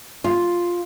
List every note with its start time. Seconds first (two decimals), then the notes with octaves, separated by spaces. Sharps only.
0.24 F4